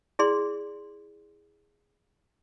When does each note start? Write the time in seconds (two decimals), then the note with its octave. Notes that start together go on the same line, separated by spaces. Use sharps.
0.19 E4 G#4 D5 C6